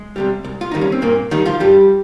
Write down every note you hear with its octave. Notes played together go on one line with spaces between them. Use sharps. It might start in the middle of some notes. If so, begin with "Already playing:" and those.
Already playing: G#3
C3 D#3 G3
C2
F4
C3 D#3 G3 D#4
C#4
C4
G2 A#2 A#3
D#3 G3 D#4
F3 F4
G2 G3 G4